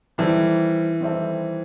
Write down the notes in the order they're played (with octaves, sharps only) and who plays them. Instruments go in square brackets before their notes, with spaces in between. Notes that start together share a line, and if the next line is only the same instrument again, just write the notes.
[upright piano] D#3 G3 C4 E4 A4 [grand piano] E3
[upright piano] D#3 G3 C4 E4 A4